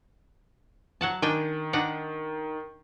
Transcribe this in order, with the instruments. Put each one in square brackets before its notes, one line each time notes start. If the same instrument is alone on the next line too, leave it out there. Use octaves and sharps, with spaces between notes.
[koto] F#3 F#5 A5
[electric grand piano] D#3 [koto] D4 G5 G#5
[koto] D4 D#4 F#5